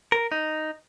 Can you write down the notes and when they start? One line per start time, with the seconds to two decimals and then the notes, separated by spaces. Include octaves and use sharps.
0.12 A#4
0.32 D#4